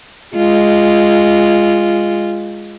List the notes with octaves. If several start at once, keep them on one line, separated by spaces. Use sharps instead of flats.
G#3 F4